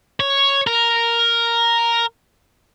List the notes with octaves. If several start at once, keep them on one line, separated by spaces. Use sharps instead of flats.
C#5
A#4